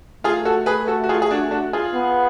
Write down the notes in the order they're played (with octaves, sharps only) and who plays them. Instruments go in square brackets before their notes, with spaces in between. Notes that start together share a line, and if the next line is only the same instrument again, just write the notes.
[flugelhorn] A3 [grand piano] F4 G#4
[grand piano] F#4 A4
G#4 B4
F#4 A4
F#4
F4 G#4
G#4
D4 F#4
D4 F#4
F4 G#4
[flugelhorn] B3